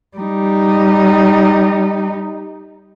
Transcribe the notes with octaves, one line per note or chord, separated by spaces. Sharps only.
G3 D#4